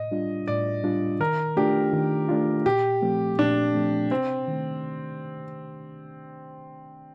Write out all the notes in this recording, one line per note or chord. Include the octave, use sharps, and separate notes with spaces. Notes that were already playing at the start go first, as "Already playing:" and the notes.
Already playing: A2 D#5
G3 D4 F4
A2 D5
G3 D4 F4
D#3 A#4
A3 D4 F4 G4
D#3
A3 D4 F4
A#2 G4
F3 A3 C4
A#2 D4
F3 A3 C4
C3 C4
D#3 A3